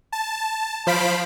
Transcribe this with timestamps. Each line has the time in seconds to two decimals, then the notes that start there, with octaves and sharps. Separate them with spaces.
0.12 A5
0.87 F3 C5 F5 B5 B6 D7